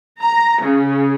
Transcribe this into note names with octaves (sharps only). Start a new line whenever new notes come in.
A#5
C#3